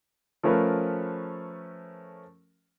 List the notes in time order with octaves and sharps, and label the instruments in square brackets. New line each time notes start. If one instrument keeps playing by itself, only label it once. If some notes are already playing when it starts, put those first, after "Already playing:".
[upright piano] F3 A3 C#4 A#4 B4